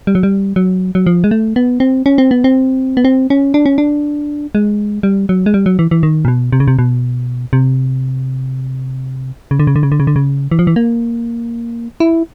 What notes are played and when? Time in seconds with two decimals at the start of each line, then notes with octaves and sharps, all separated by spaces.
0.07 G3
0.15 F#3
0.23 G3
0.56 F#3
0.95 F#3
1.07 F3
1.24 G#3
1.31 A3
1.56 B3
1.80 C4
2.06 C#4
2.18 C4
2.31 B3
2.44 C4
2.97 B3
3.05 C4
3.30 C#4
3.54 D4
3.66 C#4
3.78 D4
4.55 G#3
5.03 G3
5.29 F#3
5.46 G#3
5.54 G3
5.66 F#3
5.79 E3
5.91 E3
6.03 D#3
6.25 A#2
6.28 B2
6.52 C3
6.60 C#3
6.68 C3
6.79 B2
7.53 C3
9.51 C#3
9.60 D3
9.67 C#3
9.76 D3
9.83 C#3
9.92 D3
10.00 C#3
10.07 D3
10.16 C#3
10.51 E3
10.59 F3
10.67 E3
10.76 A#3
12.00 E4